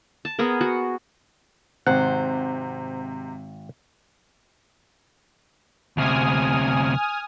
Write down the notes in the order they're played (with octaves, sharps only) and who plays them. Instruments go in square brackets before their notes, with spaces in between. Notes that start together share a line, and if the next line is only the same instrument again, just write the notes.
[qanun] A5
B3 G#4 A#4
F#4
[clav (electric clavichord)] G#1 F#5 [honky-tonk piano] C3 [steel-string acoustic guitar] C5
[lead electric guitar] D2 C3 [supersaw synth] G#5 D#6 F6